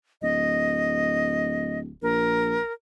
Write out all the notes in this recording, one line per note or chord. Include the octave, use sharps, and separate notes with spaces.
D1 D#5
A#1 A#4